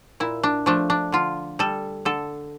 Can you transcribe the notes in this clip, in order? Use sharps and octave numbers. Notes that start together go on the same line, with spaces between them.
A#2 E4
D4
F3 A3 D4
D4
D3 F4
G3 A4
D3 A4